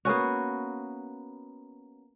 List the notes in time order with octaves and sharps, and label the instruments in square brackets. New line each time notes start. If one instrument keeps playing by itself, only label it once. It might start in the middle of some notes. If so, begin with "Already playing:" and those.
[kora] A#3 B3 C#4 F#4